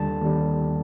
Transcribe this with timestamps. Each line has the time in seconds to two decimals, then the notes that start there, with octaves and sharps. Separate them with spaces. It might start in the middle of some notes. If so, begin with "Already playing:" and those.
Already playing: D#2 D3 G3 A5
0.21 D#2 D3 G3